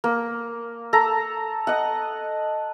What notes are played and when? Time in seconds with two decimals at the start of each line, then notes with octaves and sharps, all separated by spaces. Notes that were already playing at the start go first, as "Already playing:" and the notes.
0.04 A#3
0.93 A4 A#5
1.67 D#5 F#5